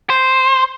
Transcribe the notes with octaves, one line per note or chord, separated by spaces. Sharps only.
C5